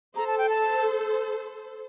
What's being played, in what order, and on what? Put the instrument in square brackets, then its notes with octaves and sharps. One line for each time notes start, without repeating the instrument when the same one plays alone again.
[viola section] A4 C5 [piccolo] A#5
[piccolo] A5
G5
A5